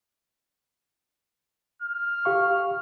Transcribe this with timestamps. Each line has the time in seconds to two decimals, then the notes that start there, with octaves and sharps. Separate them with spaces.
1.83 F6
2.25 G4 F5 C#6